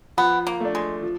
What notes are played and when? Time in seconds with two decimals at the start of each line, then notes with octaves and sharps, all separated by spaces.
0.17 F3 B3
0.47 A#3
0.60 A3 D4
0.75 G#3
1.03 F3